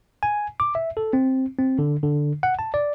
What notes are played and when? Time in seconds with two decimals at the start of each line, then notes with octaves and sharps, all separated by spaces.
0.23 G#5
0.60 D6
0.75 E5
0.97 A4
1.13 C4
1.59 C4
1.79 D3
2.03 D3
2.43 F#5
2.59 A5
2.74 D5